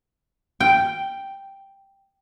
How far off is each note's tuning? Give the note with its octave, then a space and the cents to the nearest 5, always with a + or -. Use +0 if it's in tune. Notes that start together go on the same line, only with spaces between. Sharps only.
G5 +0